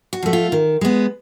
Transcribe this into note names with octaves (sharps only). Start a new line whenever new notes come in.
F#4
F3 A3
F4
D#3
G#3 B3